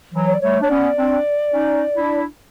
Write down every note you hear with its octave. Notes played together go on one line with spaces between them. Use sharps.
E3 F#3
C#5
D5
G3 A3 C#5
D4 C#5
B3 C#4 D5
C4 D4
C#4 D#4
D4 E4